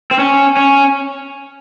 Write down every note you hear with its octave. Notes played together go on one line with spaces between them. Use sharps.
C4
C#4
C#4